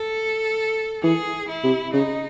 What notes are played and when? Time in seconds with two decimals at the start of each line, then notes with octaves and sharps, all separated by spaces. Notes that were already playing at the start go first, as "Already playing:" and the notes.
Already playing: A4
1.03 E3 G#4
1.48 E4
1.63 C3
1.93 C#3 D#4